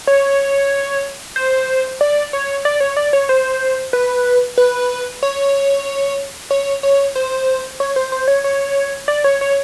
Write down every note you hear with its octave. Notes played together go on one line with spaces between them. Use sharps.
C#5
C5
D5
C#5
D5
C#5
D5
C#5
C5
B4
B4
C#5
C#5
C#5
C5
C#5
C5
C5
C#5
C#5
D5
C#5
C#5